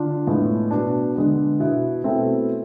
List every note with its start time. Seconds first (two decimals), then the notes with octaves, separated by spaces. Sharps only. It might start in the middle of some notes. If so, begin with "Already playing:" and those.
Already playing: D3 D4 F4
0.27 A2 G#3 B3
0.71 B2 B3 D4
1.15 D3 G#3 B3
1.60 B2 B3 E4
2.04 B2 A3 C4 E4